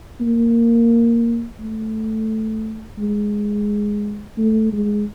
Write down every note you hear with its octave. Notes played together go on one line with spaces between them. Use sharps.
A#3
A3
G#3
A3
G#3